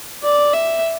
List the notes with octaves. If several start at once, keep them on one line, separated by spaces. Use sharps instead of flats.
D5
E5